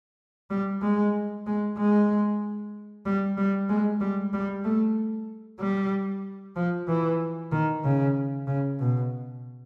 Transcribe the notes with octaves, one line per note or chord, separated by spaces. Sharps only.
G3
G#3
G#3
G#3
G3
G3
G#3
G3
G3
A3
G3
F3
E3
D#3
C#3
C#3
B2